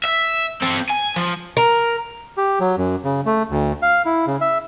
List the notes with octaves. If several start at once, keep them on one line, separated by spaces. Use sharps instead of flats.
E5
C4 A4
G#5
F3
A#4
G4
F#3
F#2
C#3
A3
D2
F5
E4
C#3
E5